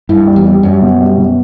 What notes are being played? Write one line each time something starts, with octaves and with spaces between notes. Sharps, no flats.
G2 E4
G3
E2
G3
F#2 G3
B2
G3
B2